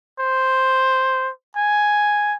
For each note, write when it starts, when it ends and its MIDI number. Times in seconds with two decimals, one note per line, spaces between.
0.20 1.31 72
1.57 2.36 80